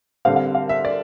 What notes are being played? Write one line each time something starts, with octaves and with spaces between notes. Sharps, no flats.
D3 G3 C4 F5
F5
F5
E5
D5